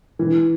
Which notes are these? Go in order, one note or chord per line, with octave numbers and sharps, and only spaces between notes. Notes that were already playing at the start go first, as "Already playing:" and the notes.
E3